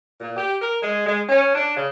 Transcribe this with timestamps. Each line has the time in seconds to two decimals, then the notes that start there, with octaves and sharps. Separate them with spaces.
0.21 A#2
0.37 G4
0.62 A#4
0.83 G#3
1.06 G#3
1.29 C#4
1.55 D4
1.76 C#3